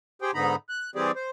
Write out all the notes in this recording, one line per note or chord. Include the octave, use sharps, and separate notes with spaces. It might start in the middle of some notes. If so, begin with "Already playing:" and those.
G4 G#4 C5 G5
G#2 D3 B3 D#4 A#5 B5
F#6
E3 G3 C4 G4 G#4 D5
C5